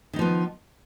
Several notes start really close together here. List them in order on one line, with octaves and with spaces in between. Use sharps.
D#3 D#4 F3 B3